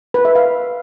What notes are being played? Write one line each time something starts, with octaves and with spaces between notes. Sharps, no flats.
B4
E5
F5